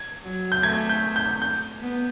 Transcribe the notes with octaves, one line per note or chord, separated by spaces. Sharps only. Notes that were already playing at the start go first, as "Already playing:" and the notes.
Already playing: G#6
F#3
G6
A3 G#6
G6
G6
G6
B3